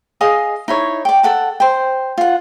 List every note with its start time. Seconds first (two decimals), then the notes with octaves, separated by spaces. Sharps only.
0.21 G#4 D#5 F5 D#6
0.68 D#4 E4 C#5
1.05 D5 G5
1.23 A4 F#5 A5
1.60 C5 G5
2.18 F4 F#5